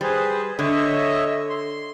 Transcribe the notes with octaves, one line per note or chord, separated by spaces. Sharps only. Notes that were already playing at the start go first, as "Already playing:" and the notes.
G3 G#4 B4 C5
D3 C#5 D#5 E5
C6